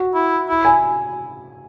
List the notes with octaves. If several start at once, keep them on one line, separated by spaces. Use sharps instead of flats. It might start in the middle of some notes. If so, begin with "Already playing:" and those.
Already playing: F#4
E4
E4
G#5